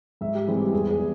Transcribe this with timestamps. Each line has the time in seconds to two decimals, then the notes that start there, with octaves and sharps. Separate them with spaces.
0.21 G#2 E5
0.35 G4
0.47 E3 G3 C4 G#4
0.60 G4
0.72 E2 G#4
0.90 G#4
0.99 E3